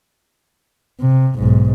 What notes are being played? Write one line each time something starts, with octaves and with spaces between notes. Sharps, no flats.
C3
B1 G#2